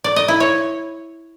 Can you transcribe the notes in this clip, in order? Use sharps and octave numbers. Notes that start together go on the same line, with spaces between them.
D5
D#5
E4
C#5